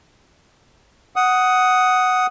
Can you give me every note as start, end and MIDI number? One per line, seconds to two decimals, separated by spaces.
1.16 2.26 78
1.16 2.26 87